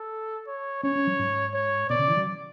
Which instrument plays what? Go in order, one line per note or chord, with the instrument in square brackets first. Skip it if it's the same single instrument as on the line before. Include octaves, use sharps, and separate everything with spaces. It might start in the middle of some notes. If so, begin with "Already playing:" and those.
Already playing: [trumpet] A4
C#5
[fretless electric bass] C#4 [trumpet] C#5
[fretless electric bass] C#4
F#3
G#2
[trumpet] C#5
[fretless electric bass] B2 [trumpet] D5
[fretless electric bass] C#3
E3
F#3